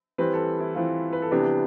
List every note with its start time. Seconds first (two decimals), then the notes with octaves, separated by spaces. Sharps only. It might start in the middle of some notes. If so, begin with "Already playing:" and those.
0.18 E3 G3 C4 B4
0.33 A4
0.60 E4
0.75 E3 G3 C4 F4
1.13 B4
1.22 A4
1.31 C3 E3 G3 B3 D4 G4